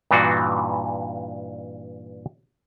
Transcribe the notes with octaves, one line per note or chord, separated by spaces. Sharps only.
G2 A#2 E3 D4 D#4 F#4